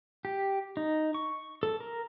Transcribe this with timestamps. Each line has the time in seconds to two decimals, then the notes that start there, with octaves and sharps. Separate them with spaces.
0.25 G4
0.77 D#4
1.14 C#6
1.63 A4
1.80 A#4